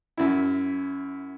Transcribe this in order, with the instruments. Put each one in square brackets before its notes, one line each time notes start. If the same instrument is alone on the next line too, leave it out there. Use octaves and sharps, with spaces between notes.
[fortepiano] F#2 E4